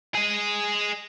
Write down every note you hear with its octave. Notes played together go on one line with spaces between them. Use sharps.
G#4 D#5